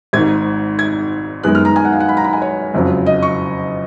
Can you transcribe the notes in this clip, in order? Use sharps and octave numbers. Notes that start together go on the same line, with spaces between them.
G#1 G#2 D#3 G#6
G#6
F#2 D#3 G#3 B3 F#6
F6
A#5
G#5
F#5
F5
F#5
B5
A#5
B5
G#5
C#5
F#1 F2 C#3 F#3
D#5
C#6